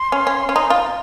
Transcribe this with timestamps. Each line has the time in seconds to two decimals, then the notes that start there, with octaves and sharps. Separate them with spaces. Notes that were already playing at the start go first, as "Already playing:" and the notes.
Already playing: C6
0.12 C#4
0.27 C#4
0.49 C#4
0.56 D#4
0.70 F4